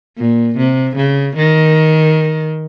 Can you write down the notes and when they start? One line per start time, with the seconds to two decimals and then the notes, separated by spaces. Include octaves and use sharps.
0.18 A#2
0.58 C3
0.97 C#3
1.36 D#3